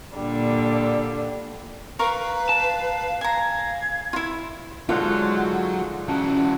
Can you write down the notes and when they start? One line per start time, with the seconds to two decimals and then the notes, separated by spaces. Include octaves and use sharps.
0.15 A#2 D3 G3 D4
1.99 A#4 B4 F5 A#5 C#6
2.49 A5
3.21 G#5 A#5 G#6
4.13 E4 F4
4.89 G#2 D3 F#3 F4 F#5
6.08 E3 C#4 F#4 A5